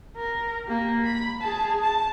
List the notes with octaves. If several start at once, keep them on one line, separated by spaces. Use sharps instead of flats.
A#4
A#3 G4
B5
G#4 A5
A5